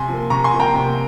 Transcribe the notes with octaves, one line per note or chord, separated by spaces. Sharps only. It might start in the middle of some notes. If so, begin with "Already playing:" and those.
Already playing: C3 G#5 C6
F3 A#3
C3 A#5 C#6
G#5 C6
F3 A#3
G5 A#5
C3